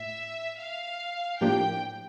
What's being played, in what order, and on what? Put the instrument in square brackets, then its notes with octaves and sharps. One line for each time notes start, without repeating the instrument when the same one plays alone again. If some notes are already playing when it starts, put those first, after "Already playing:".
Already playing: [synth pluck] A2 [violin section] E5
[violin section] F5
[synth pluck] A2 F3 A#3 D4 G4 [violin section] G5